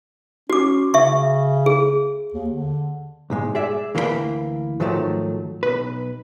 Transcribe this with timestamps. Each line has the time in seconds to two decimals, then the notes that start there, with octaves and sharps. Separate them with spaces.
0.50 C#4 F#4 D6
0.94 C#3 E5 C#6
1.66 G#4
2.34 D#2
2.50 D3
3.30 B1 G#2 G#3
3.55 G#4 D5 E5
3.95 D2 E3 A#3 A#4 G5 B5
4.80 G#2 D#3 F3 F#3 A3
5.63 B1 B4